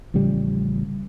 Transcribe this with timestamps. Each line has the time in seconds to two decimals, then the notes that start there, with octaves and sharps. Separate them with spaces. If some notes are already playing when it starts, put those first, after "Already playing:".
0.14 A1 C#3 F3 G3